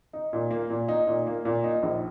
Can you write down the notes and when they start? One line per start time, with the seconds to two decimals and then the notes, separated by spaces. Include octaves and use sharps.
0.13 D#4
0.33 A#2
0.51 A#3
0.70 A#2
0.88 D#4
1.07 A#2
1.27 A#3
1.45 A#2
1.64 D#4
1.83 A#1